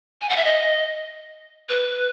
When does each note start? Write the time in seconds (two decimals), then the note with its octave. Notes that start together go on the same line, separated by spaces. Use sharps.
0.21 G#5
0.29 F#5
0.36 E5
0.45 D#5
1.69 B4